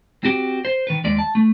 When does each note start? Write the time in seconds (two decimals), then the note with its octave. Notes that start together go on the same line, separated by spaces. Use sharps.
0.24 C4 F#4 G4
0.65 C5
0.87 D#3 B4
1.04 D#2 G#3 D5
1.19 A5
1.35 A3